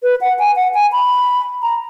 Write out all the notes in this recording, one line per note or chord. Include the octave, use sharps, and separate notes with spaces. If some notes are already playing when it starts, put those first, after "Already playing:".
B4
F#5
G#5
F#5
G#5
B5
A#5